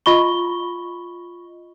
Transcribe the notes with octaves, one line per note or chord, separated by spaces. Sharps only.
F4 D#5 B5 C#6 G7